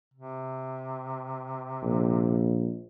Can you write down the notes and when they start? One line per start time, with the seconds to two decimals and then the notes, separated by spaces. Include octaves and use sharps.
0.14 C3
1.82 A#1